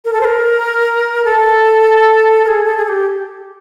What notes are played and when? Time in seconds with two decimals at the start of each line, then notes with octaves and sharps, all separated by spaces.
0.05 A#4
0.13 A4
0.21 C5
0.25 A#4
1.25 A4
2.44 A#4
2.48 G#4
2.65 A4
2.77 G#4
2.85 A4
2.89 G4